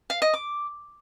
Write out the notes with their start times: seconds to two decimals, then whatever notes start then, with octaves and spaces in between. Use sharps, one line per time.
0.10 F5
0.22 D#5
0.34 D6